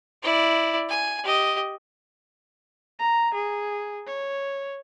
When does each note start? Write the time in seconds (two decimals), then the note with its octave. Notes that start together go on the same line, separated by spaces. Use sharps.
0.22 E4 D5
0.89 G#5
1.24 G4 D#5
2.99 A#5
3.34 G#4
4.07 C#5